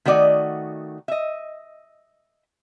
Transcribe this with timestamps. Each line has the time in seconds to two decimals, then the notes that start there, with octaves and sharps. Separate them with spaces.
0.05 D#3 A3 F#4 D5 D#5
1.08 D#5 E5